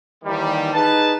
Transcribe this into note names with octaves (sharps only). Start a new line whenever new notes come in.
D#2 D#3 E3 G3
D#4 G#4 B4 A5